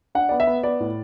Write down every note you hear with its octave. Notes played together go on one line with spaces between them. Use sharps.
D4 F#5
B3 D5
E5
B3
B3 D5
A2